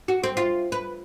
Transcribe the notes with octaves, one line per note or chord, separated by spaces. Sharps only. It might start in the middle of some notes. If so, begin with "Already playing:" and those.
F#4
C4
F4
B4